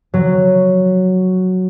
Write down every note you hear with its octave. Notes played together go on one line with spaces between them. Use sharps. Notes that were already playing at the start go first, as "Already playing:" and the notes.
F#3